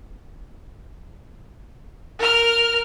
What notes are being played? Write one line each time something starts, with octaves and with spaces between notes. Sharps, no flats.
A#4 F6